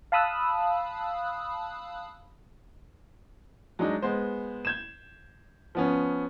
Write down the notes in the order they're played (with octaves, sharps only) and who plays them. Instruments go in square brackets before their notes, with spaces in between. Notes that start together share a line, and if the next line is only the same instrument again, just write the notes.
[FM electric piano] F5 A5 B5 D#6 E6 F#6
[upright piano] F#3 G#3 D4 D#4
G#3 B3 C5
G6 G#6 E7
F3 B3 C#4